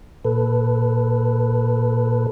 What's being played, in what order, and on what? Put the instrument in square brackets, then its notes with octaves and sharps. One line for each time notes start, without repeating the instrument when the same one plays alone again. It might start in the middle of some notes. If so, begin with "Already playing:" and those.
[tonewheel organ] A#2 A4 B4